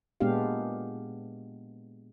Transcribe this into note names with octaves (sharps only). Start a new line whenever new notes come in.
A#2 G#3 B3 D4 G4 F5